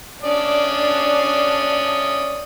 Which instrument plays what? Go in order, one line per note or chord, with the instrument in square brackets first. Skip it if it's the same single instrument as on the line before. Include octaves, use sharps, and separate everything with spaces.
[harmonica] C#4 D5 D#6 [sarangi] D4